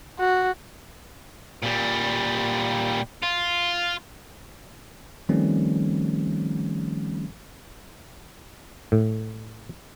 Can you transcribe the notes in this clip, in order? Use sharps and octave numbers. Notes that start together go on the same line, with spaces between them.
F#4
A#2 G3
F4
D#3 F3 G3 A3 C4 C#4
A2